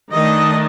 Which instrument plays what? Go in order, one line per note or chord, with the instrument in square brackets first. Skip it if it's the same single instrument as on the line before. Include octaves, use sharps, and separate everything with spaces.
[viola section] D#3 A3 D4 D#5